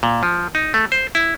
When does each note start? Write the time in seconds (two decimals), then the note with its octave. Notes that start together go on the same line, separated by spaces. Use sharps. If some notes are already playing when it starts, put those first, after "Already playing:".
0.03 A#2
0.23 F3
0.55 D#4
0.74 A3
0.92 C5
1.15 E4